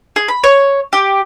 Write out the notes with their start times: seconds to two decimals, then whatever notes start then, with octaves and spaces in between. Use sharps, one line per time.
0.16 G#4
0.28 B5
0.44 C#5
0.93 G4